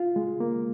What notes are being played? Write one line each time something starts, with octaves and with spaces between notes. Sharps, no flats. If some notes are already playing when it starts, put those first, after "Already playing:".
Already playing: F4
G#3
A#3